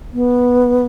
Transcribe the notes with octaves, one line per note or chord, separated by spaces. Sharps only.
B3